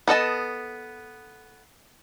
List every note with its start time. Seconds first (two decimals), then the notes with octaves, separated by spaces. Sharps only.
0.08 B3 A4 D#5 A5